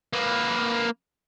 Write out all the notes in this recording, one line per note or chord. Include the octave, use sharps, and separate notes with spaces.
A#3 B4